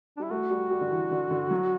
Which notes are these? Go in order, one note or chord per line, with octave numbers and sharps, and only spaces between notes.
D4
G3 E4
A3 F#4
G3
G3
D3
E3
D3
D3
F#3